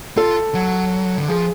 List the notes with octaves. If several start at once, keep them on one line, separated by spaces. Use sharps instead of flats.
F4 A4
F#3
D3
F3 G#4